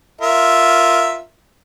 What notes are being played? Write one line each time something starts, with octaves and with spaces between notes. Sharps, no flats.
F4 A#4 E5